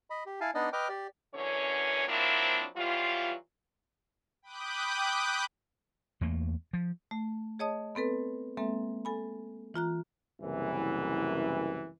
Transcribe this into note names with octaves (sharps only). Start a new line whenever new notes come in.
D#5 B5
G4
E4 F5 G#5 A5
B3 D4 D#4 D5 D#5
B4 D#5 G5 D6 F6
G4 D5
F#2 D3 E3 C#4 C#5
F3 F#3 A#3 C4 D4 E4
E3 F#3 G3 F4
G5 B5 D6 D#6 F#6 G6
E2 A3 A#3
F3
A3
G#4 C#5 D#5 A5 D#6
B3 C4 A4 B4
G#3 A#3 C4 A4 E5
A4 G#5 B5
E3 F4 A#5 F#6
F#1 C2 F#2 E3